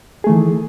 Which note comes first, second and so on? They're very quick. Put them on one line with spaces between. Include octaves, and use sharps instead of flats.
G#4 A3 D#3 E3